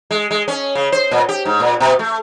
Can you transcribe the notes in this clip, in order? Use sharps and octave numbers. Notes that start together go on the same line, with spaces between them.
G#3
G#3
C#4
C#3
C5
A#2
G4
G#2
A#2
B2
A3